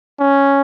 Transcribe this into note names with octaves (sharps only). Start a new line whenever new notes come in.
C#4